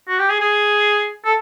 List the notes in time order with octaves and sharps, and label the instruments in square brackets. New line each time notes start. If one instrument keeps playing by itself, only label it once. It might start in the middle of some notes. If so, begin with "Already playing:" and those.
[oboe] F#4
G4
G#4
G#4
A4